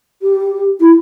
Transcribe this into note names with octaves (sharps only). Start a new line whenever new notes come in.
G4
E4